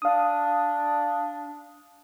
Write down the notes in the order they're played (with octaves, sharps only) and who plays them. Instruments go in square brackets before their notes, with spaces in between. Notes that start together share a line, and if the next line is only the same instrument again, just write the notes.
[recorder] D4 [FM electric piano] F5 D#6